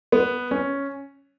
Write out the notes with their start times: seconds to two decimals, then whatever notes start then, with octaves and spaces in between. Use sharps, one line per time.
0.12 B3
0.51 C#4